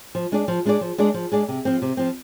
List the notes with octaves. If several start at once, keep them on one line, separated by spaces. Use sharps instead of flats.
F3
G#3 D4 G#4 D5
F3
G#3 D4 G#4 D5
F3
G#3 D4 G#4 D5
F3
G#3 D4 G#4 D5
C3
F3 C4
C3
F3 C4